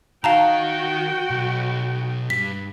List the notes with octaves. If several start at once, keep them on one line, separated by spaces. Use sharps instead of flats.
D#3 F#4 F5 G5 A5 A#5
B1
G2 B6